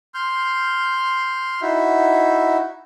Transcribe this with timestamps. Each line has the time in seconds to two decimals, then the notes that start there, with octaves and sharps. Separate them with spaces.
0.14 C6 F6 G6
1.62 D#4 E4 F#4 E5